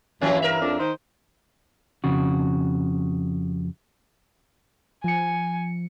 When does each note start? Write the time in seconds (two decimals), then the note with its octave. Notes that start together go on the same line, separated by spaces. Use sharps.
0.21 G2 E3 F3 A#3 C#4
0.42 A#4 E5
0.60 F2 D4
0.79 D#3 C5
2.04 F2 C#3 F#4
5.04 F3 G#5 C#7